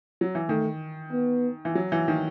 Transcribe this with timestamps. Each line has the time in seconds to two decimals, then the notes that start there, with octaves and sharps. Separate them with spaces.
0.21 F#3
0.35 E3
0.49 D#3 A3
1.12 B3
1.65 E3
1.75 F#3
1.92 E3
2.08 D#3